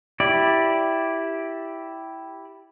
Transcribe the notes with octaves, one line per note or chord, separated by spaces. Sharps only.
E4 G4 D5